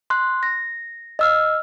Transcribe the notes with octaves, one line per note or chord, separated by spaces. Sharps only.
C6 F#6
A#6
D#5 E6 F6